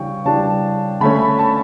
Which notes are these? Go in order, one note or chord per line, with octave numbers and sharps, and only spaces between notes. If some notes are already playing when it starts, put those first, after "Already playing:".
Already playing: C#3 E3 G3 D4 G5 C#6
C#3 E3 G3 D4 A5
D3 A3 C#4 B5
A5